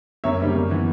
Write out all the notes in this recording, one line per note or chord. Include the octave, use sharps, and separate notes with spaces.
F#2 C#5 E5
C#3 G3 A#3
F#2
E3 B3